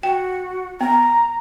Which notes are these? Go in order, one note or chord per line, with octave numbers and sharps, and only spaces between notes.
F#4 G5
B3 A#5